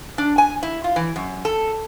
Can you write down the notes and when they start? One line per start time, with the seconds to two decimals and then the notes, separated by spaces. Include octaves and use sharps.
0.18 D4
0.38 G#5
0.63 E4
0.84 F4
0.96 E3
1.16 F#2
1.45 A4